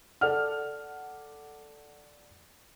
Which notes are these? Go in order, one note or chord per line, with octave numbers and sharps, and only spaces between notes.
A4 D5 F#5 F6